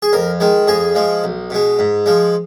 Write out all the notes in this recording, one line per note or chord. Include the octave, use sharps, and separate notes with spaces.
G#4
F2 A#4
D#3 G#3
F2 G#4
F3 G#3
B1
B2 G#3
G#2
F3 G#3